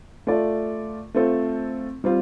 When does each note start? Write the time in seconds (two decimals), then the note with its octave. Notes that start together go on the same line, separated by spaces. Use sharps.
0.27 A3 F4 A4 D5
1.14 A3 C4 F4 A4
2.04 G3 C4 F4